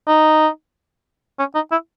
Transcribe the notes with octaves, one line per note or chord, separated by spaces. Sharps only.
D#4
C#4
D#4
E4